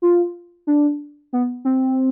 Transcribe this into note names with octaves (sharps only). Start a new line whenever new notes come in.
F4
D4
B3
C4